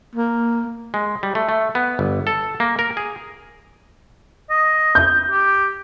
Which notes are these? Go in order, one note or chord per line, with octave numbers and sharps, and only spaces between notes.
A#3
G#3
G3
A3
A3
B3
G1
A4
A#3
A#4
G#4
D#5
G6
G4